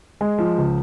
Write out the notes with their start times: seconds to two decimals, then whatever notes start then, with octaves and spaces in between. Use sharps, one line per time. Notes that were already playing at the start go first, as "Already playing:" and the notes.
0.21 G#3
0.38 F3
0.58 C#2